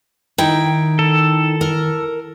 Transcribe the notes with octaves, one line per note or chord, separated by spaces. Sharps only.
D#3 D#4 E4 G5
A4
A#4